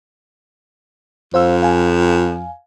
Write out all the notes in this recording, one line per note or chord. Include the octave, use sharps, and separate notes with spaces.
F2 C5 F5 E6
F5 G#5